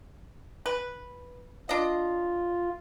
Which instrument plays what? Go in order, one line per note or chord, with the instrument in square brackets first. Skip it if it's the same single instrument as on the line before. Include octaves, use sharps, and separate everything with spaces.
[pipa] B4
[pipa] D4 D#5 [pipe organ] F4